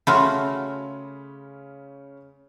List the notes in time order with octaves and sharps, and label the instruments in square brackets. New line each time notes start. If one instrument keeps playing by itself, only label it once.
[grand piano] C#3 C#4 [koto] A3 F4 F#4 [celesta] B5 C6